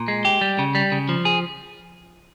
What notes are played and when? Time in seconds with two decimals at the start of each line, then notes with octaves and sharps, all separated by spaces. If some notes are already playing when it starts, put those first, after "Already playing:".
Already playing: A#2
0.08 G#3
0.25 G4
0.41 G3
0.59 C#3
0.75 G3
0.92 C#3
1.09 F3
1.25 G#4